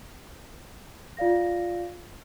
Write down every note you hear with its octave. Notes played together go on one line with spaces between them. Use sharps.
F4 D5 F5 A#6